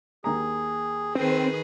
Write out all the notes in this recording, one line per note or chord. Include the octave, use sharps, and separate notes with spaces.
D#2 G#4 A#5
D#3 C4 G#4 B4